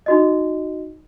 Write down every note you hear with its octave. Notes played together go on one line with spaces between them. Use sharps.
D#4 F#4 D#5